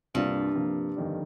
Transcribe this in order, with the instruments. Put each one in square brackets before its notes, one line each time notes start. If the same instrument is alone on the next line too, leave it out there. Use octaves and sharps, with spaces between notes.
[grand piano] C2 C3 G3 A#3 F4 [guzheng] G2
[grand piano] C3 F3 A#3
G1 F2 D#3 G3